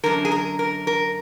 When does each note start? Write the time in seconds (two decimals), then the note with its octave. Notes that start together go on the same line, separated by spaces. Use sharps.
0.04 F#2 D3 A#4
0.25 G#4
0.31 A#4
0.59 A#4
0.87 A#4